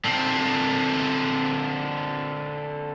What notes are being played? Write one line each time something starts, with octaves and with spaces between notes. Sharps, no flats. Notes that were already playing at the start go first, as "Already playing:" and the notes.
D3 C4